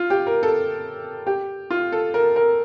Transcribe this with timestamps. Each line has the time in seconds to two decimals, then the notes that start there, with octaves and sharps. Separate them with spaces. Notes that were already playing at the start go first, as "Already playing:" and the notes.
Already playing: F4
0.10 G4
0.27 A#4
0.43 A4
1.27 G4
1.71 F4
1.92 A4
2.14 A#4
2.36 A#4